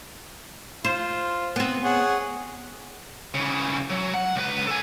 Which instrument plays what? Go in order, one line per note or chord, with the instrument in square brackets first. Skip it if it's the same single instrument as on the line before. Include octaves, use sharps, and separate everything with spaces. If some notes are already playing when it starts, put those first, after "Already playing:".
[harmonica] F4 [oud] C5
[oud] B3 C4
[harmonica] G#4 C#5 F#5
[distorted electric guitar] C#3 E3
F#3
F#5
C#2 B4
A4 G#5